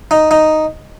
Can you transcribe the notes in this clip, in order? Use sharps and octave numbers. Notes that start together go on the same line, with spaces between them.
D#4
D#4